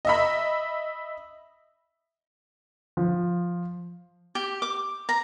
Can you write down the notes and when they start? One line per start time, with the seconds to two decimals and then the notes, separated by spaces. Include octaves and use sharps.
0.05 D#5 E5 B5
2.97 F3
4.35 G4
4.62 D6
5.09 A#5